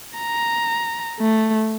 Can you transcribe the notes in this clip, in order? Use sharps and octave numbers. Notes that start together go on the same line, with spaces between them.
A#5
A3